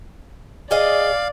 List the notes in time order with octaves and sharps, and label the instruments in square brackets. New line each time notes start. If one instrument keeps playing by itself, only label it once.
[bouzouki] G#4 D#5 [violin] D5 [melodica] F5